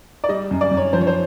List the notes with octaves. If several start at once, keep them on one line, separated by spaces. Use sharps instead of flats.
D5
G3 D#5
F#2
D5
F#2
C#5
F3 C5
C#5
C5